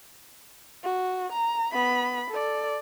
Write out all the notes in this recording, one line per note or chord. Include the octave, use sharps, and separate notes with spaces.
F#4
A#5
B3 B5
A4 D5